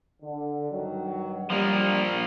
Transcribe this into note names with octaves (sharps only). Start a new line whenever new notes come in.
D3
G2 D#3 F#3
F3 G3 A#3